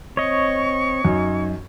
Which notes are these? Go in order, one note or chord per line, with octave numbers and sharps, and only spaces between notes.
C4 C#5 D#5 C#6
F#2 D#4